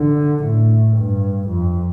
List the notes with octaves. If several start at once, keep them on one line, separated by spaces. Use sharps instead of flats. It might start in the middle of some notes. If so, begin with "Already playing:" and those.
Already playing: D3
A2
G2
F2